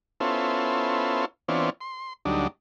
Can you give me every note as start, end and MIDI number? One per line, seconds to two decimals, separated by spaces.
0.20 1.25 59
0.20 1.25 61
0.20 1.25 64
0.20 1.25 65
0.20 1.25 69
0.20 1.25 72
1.48 1.70 52
1.48 1.70 59
1.48 1.70 60
1.48 1.70 62
1.48 1.70 65
1.48 1.70 73
1.81 2.13 84
2.25 2.47 38
2.25 2.47 54
2.25 2.47 55
2.25 2.47 62
2.25 2.47 63